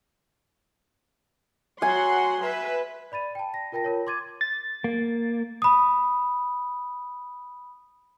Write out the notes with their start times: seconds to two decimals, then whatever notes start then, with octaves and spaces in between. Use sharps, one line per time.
1.82 F#3 F#5 G#5 C6
2.44 B4 E5
3.12 D5 B5 A6 D#7
3.35 G5 A5
3.54 A#6
3.72 F4 A#4 G5 A5 A#6
3.84 F4 A#4 C#5
4.07 C6 D6 G#6 A6 D#7
4.41 A6
4.84 A#3
5.62 B5 D#6